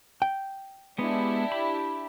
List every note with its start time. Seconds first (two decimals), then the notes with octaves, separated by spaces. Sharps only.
0.22 G5
0.98 G#3 B3 D4 E4 G4
1.52 B5